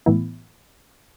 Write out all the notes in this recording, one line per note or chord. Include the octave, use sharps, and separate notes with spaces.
A2 E3 B3 E4